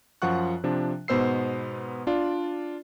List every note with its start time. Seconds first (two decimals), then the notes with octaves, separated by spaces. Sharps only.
0.22 F#2 F3 F4 F#5 C#6 F#6
0.64 C3 F3 D4
1.08 G#2 B2 B3 C5 E6 C7
2.07 D4 F4 D5